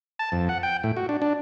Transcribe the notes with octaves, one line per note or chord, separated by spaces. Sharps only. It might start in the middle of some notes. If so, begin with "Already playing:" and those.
A5
F2
F#5
G5
A2
F#4
D4
D4